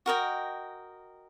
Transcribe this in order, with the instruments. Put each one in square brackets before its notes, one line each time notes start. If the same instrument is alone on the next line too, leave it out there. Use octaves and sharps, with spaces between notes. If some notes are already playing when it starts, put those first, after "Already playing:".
[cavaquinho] F#4 A#4 D#5 G5